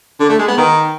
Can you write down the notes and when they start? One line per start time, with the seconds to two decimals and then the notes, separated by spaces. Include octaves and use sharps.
0.20 D3
0.29 A3
0.38 G#3
0.48 B3
0.57 D#3